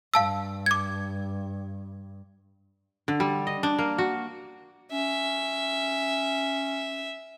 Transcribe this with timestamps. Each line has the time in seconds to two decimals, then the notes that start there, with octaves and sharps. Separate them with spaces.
0.14 G2 F5 A5 E6
0.66 D6 G#6
3.08 D3
3.20 G3
3.47 D#5
3.63 D4
3.79 A#3
3.98 F#4
4.92 C#4 E5